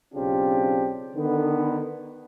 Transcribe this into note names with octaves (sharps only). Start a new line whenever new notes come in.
B1 C#3 C4 D4 F4 G4
D3 D#3 B3